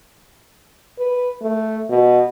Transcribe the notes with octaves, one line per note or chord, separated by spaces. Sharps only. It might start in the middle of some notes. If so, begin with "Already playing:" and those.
B4
A3
B2